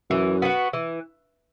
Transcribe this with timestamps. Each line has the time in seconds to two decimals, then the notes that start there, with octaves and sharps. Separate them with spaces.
0.10 F#2 E3
0.42 B3 F#4
0.73 E3